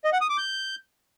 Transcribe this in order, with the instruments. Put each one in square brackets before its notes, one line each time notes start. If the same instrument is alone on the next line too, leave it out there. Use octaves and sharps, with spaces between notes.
[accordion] D#5
F#5
D#6
D6
G6